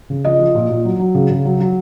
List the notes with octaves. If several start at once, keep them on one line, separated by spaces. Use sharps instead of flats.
C#3
F3 D#5
F3
A#2
A#2
F#3
F#3
C#3
C#3
F#3
F#3